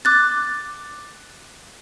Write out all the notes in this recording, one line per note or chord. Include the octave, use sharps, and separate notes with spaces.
D6 F#6 A6